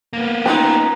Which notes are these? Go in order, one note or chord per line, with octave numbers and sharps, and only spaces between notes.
A#3 B3
G3 C#4 D#4 F4 B4 G5 A#5